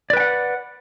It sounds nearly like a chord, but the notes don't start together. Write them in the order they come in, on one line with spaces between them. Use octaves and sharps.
D5 B4 G5 F#5